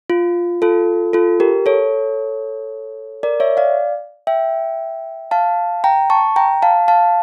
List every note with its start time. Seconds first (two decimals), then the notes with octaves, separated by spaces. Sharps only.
0.10 F4
0.62 F4 A4
1.13 F4 A4
1.40 G4 A#4
1.66 A4 C#5
3.23 A#4 D5
3.40 C#5 E5
3.57 D5 F5
4.27 E5 G5
5.31 F5 A5
5.84 G5 A#5
6.10 A5 C#6
6.36 G5 A#5
6.62 F5 A5
6.88 F5 A5